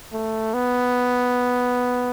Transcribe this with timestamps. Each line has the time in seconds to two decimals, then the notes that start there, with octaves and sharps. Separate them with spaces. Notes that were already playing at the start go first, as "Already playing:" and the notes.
0.13 A3
0.54 B3